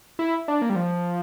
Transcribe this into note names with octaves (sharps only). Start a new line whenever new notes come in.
E4
D4
A#3
G3
F3